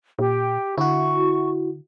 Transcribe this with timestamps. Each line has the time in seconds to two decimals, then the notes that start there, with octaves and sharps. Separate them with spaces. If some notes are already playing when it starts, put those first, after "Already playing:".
0.19 A#2 G4
0.78 D3 E4 F#4 C#6